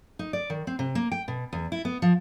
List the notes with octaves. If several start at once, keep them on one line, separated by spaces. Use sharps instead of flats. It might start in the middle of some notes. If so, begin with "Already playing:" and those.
D#4
D5
D#3
C4
C3
A#3
G5
B2
E2
E4
B3
F3